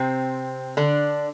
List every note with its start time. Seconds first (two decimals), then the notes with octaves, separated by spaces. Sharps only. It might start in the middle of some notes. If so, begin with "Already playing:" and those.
Already playing: C3 C4
0.77 D3 D4